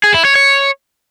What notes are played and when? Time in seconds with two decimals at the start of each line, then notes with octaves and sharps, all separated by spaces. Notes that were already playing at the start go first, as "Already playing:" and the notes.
0.04 G#4
0.14 E4
0.25 C#5
0.35 C#5